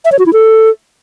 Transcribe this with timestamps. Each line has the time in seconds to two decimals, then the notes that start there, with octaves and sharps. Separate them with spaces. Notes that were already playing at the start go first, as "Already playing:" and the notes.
0.05 E5
0.12 C#5
0.19 F#4
0.26 E4
0.33 A4